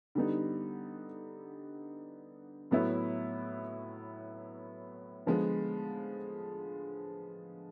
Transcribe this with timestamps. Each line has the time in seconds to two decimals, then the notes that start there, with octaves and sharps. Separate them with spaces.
0.15 D3 G3 B3 D#4
2.71 A2 F#3 B3 E4
5.26 D3 F3 G#3 B3